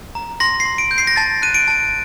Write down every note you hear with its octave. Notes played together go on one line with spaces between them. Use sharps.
A#5
C6 A#6
C7
C6
D7
G6
C7
A#6
A5 A6
F#6 D#7
D7
A5